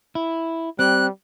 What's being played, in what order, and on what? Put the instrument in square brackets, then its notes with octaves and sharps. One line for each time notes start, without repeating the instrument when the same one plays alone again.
[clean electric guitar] E4
[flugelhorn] G3 [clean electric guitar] C4 [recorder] F#6